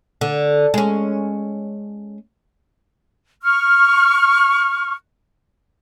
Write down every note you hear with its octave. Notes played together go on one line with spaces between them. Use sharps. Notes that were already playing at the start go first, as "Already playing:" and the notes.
D3
G#3 C#4
C#6 F6